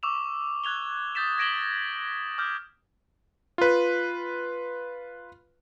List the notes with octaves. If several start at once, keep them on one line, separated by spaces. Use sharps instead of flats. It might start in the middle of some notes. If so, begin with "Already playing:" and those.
C#6 D6 E6 E7 F7
F#6 G#6 F7 G7
D#6 G6 A6 B6 E7
G#6 A#6 D7 E7 F#7 G7
D6 F6 G6
F4 B4